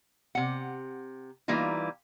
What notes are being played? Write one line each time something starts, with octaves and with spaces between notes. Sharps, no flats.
C3 F#5
E3 G3 A#3 D#4 F4